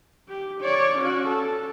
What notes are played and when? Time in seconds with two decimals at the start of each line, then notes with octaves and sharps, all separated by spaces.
0.29 G4
0.62 C#5 D5
0.99 C#4 F#4
1.28 A4